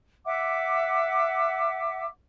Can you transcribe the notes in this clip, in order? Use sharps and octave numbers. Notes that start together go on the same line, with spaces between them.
E5 F#5 D6